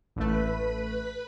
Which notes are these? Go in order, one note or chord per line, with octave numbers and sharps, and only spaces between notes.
A1 A3 B4 B5